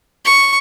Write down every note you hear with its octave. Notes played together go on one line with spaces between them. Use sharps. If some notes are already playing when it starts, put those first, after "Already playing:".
C#6